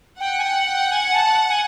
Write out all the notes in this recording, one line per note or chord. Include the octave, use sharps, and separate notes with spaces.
F#5 G5
G#5
G5
G5
G#5
A5
G#5